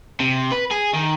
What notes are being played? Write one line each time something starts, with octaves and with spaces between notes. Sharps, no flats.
C3
B4
G#4
D#3